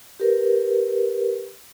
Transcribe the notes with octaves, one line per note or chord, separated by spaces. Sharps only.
G4 A#4 B4